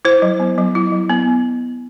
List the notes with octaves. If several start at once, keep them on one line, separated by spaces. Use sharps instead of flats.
E4 C5
F#3
B3
F#3
E4
F#3
B3